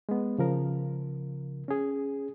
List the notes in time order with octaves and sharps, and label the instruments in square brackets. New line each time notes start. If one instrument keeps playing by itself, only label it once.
[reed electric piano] G#3 B3
C#3 F3 A#4
C#4 G#4